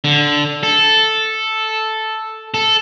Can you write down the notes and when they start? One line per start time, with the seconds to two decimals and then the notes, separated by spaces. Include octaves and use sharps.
0.04 D3
0.63 A4
2.54 A4